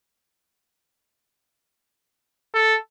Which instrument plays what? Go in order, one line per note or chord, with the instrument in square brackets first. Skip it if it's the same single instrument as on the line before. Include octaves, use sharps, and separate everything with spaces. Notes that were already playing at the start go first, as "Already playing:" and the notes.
[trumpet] A4